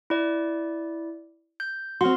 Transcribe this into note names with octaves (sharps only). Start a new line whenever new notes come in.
E4 D5
G6
C4 F#4 C6 F6